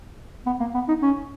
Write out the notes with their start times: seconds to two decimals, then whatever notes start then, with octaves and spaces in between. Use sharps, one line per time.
0.46 B3
0.60 A#3
0.74 B3
0.88 D#4
1.02 C#4